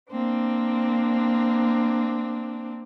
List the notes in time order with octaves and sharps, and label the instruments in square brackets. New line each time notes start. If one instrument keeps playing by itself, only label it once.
[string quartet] A#3 C4 D4